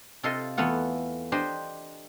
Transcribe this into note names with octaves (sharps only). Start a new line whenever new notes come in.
C3 F4 A4 D#5 C6
E2 A3 B3 F4 F#5
D4 G4 C5 D#5